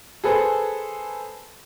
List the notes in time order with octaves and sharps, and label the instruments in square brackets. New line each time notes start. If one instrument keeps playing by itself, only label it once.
[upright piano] G#4 A4 B4 C5